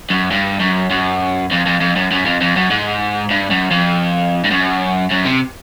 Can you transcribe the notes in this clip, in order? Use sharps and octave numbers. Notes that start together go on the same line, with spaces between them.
F#2
G2
F#2
F#2
F2
F2
F2
F#2
F#2
F2
F2
F#2
G#2
G2
F#2
F2
G2
F#2
F#2
C3